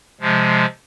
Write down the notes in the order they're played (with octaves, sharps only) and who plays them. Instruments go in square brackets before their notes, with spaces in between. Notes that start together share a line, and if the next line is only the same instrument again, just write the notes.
[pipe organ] C3 F3 G#3